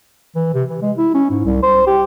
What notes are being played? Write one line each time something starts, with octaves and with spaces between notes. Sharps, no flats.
E3
C3
E3
G#3
E4
C#4
G#2
C2
C5
G4